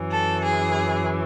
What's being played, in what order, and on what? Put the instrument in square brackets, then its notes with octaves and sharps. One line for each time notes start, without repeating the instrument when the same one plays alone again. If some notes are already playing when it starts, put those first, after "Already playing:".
Already playing: [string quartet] F#2 E3
A4
G#4